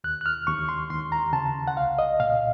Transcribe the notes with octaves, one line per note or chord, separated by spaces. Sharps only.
D#2 F#6
F#6
F6
D#2 C#6
C6
D#2 C6
A#5
C#3 A5
F#5
C2 F5
D#5
A#2 F5